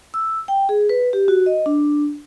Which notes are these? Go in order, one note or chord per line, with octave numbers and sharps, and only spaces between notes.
E6
G5
G#4
B4
G4
F#4
D#5
D4